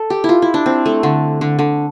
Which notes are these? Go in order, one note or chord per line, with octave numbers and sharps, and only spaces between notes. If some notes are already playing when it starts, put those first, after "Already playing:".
Already playing: A4
G4
E4
F4
E4
D4
C4
A3
D3
D3
D3